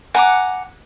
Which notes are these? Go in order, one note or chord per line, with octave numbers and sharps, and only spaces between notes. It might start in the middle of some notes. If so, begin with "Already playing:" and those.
F#5 G#5 A#5 D6